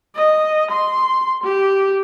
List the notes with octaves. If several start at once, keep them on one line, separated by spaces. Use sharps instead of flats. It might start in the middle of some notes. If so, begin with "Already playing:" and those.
D#5
C6
G4